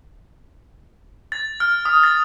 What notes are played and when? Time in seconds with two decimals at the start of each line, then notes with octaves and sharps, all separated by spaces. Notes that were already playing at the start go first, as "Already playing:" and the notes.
1.32 A6
1.60 F6
1.85 D#6
2.03 A6